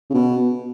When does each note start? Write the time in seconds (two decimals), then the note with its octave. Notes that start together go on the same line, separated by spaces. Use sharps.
0.10 C#3
0.14 B2